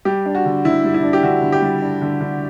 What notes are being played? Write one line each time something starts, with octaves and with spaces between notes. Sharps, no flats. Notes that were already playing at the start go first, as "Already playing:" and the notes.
G3 G4
D4
F#4
D3
D3 E4
G3
E4
D4
G4
D3 F#4
D3
G4
G3
D4
D3
D3